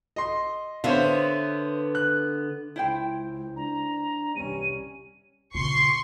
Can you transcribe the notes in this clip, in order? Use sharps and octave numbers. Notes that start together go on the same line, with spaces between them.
D#5 C6
D3 B3 C5 C#5 E5 F5
F#6
C#2 E4 C5 G5
D4 A#5
C2 E3 G3 C#4 D#7
A#2 C#3 C6 C#6 C7